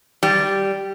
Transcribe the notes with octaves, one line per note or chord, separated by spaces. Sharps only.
G3